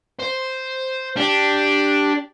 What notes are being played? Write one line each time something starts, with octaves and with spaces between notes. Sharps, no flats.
C5
D4 G4